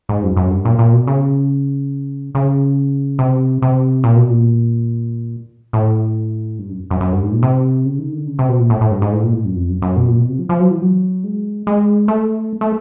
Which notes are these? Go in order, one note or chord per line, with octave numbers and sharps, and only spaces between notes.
G#2
F#2
F#2
G2
A#2
A#2
B2
C#3
C#3
C3
C3
A#2
B2
A#2
A2
G2
F#2
F#2
F#2
G2
G#2
A#2
C3
C#3
D#3
D3
C#3
C3
B2
A#2
A2
A2
G2
G#2
A2
A#2
A2
F#2
F2
F#2
F#2
B2
A#2
B2
C3
F3
F3
F#3
E3
F#3
G#3
G#3
A3
A3